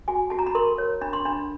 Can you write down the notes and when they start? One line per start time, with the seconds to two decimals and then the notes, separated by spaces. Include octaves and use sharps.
0.08 F#4 G#5
0.30 F#4 A5
0.39 A#5
0.47 B5
0.55 A#4 C6
0.78 C#5
1.01 D4 B5
1.13 C6
1.25 D4 B5